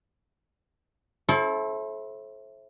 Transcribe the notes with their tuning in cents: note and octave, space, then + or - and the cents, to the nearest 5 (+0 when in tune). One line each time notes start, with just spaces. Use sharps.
E4 +0 A4 -30 C5 +40